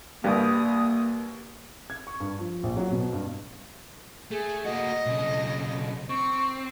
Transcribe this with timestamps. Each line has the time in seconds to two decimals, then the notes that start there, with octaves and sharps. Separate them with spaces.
0.24 C2 G2 G3 A#3 B5 D#6
1.90 G#6
2.07 C#6
2.20 G2
2.39 F3
2.63 A#1
2.77 F#3
2.92 B2
3.13 G2
4.31 A3 G#4
4.64 A#3 F#4 D#5
5.06 B1 C#3
6.09 C4 C#6